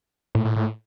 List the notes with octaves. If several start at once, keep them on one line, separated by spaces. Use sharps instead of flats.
A2
A2
A2